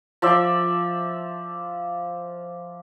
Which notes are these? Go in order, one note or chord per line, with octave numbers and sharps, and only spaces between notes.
F3 D5 E5